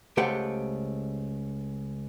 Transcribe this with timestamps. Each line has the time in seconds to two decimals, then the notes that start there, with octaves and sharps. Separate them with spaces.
0.17 C#2 A3 G4 C5 F#5